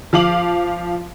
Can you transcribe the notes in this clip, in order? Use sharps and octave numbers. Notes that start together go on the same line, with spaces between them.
F3 F5 D6 F#7